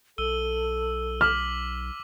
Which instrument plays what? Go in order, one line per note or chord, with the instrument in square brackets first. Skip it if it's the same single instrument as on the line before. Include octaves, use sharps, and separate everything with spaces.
[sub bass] B1 [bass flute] A4 [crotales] E6 D#7 G7
[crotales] D6 B6 F#7 [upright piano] F6